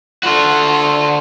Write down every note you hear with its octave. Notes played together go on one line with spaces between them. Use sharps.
D3 F4 F#4 A4